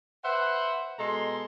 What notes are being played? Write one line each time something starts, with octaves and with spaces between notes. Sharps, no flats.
B4 C5 E5 F#5
B2 G#3 A4 A#5 C6